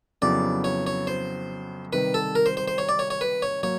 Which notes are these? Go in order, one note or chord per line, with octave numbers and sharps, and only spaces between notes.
F2 C#3 F#3 B3 E4 D5
C#5
C#5
C5
C3 D#3 G3 B4
A4
A#4
C5
C5
C5
C#5
D5
C#5
C#5
B4
C#5
F#3 A#3 C#5